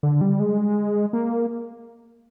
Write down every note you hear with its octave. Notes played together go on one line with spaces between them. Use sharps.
D3
G3
G#3
A#3